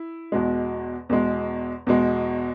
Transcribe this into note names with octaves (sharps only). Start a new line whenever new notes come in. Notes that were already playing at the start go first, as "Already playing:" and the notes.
Already playing: E4
E2 B2 G#3
E2 B2 G#3
E2 B2 G#3